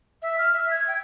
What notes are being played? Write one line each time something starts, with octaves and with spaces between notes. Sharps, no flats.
E5
F6
E5
G#6
G5